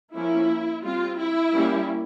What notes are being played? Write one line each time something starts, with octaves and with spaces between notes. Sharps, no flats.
F3 A#3 C#4 E4
G3 C4 F4
E4
G3 A#3 C#4